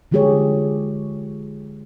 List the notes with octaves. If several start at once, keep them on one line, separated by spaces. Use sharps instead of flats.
D3 F3 G#3 G4 G#4 C#5